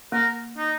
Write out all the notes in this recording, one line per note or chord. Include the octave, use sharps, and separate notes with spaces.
A#3 A#4
D#4